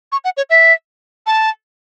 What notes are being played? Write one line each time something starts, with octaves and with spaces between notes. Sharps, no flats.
C#6
F#5
C#5
E5
A5